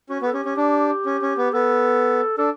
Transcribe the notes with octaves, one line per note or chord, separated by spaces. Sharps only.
C#4 F#4
B3
A4
C#4 G4
C#4
D4
C#4
C#4
B3
B3 A4
D4 A4